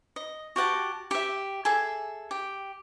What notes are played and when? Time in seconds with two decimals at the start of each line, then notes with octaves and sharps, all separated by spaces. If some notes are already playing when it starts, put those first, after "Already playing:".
0.16 D#5
0.56 F#4 G4 F#5 A5
1.11 G4 E5
1.65 G#4 A4 E5
2.31 G4